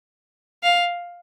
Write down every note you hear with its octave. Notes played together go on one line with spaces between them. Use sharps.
F5